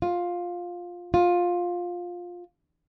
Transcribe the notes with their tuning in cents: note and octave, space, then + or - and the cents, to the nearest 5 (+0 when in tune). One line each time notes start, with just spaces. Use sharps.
F4 +10
F4 +15